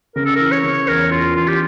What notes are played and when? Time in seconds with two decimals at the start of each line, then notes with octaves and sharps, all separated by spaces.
0.15 C#3 A#4
0.26 A4
0.36 E3 A#4
0.52 C#5
0.64 C#3
0.88 E2 A#4
1.11 E2 F4
1.36 E2 F4
1.48 G4